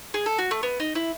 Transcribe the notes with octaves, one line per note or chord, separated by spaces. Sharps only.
G#4
A4
F#4
A3
B3
D#4
E4